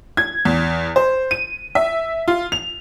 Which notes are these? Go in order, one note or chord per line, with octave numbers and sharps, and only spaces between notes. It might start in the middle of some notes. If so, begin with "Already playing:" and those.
G#6
E2
C5
D#7
E5
F4
F7